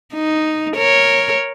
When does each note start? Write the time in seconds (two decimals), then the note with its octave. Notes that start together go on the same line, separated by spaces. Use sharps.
0.14 D#4
0.77 A#4 C#5